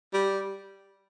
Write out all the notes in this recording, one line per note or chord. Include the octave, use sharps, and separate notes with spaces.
G3